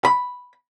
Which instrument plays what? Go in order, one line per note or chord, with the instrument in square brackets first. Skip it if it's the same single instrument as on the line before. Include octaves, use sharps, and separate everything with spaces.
[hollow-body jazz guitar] B5